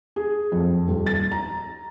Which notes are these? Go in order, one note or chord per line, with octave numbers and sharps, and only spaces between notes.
G#4
F2
D#1
A6
A#5